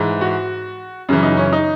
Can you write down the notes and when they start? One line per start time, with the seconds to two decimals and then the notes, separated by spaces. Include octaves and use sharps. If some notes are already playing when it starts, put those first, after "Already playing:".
Already playing: G#2 E3
0.21 F#4
1.09 F#2 C#3 E3
1.23 D#4
1.37 C#4
1.53 D#4